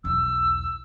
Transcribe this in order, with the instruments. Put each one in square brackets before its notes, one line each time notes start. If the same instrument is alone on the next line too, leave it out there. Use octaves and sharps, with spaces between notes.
[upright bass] B1 E2 [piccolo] E6